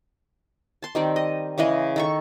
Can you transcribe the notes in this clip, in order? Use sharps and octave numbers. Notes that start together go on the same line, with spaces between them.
A5 C6
D#3 G3 C4 D5
D#5
C#3 E3 G#3 D#5
D#3 A4 C#6